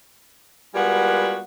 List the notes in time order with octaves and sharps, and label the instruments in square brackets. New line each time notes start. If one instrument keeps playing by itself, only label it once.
[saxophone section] G3 G#3 A#3 B3 F4 F#4